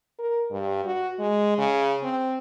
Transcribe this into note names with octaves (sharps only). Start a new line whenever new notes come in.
A#4
G2
F#4
G#3
C#3
C4